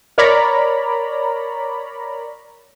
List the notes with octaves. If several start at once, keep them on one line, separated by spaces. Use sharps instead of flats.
A#4 C#5 D5 A#5 B5